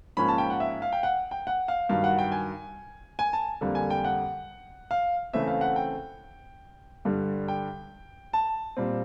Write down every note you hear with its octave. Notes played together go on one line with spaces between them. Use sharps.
G#2 F3 A#3 C#4 B5
A5
G5
F#5
E5
F5
G5
F#5
G5
F#5
F5
G2 D#3 F#3 F5
F#5
G5
G#5
G#5
A5
F2 D3 G3 A#3
G#5
G5
F#5
F5
C#3 E3 A3 C4 E5
F5
F#5
G5
G2 D3 G3
G5
A5
A#2 G3 C4